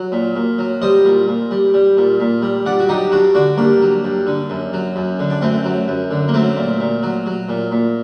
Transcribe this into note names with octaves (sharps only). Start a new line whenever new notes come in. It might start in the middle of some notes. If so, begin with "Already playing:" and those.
Already playing: F#3
A#2
A#2
F#3
G3 C5 D#5
A#2
A#2
G3
G3
A#2
A#2
G3
G2 D5 F#5
F#4
F#3 D#4 G4
G2 D4 F#4
D3 D4 F#4
G2 A#3 D4
F#3
G2
D3
F#2
F#3
F#2
D3
D4
F#2 A3 C4
F#3
F#2
D3
A#3
F#3 A3 C4
A#2
A#2
F#3
F#3
A#2
A#2